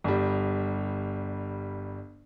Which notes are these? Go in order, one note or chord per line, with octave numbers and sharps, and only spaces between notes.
G1 G3